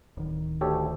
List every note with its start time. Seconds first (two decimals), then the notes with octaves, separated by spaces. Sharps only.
0.17 D1 D#3
0.61 D2 G4 A4 C#5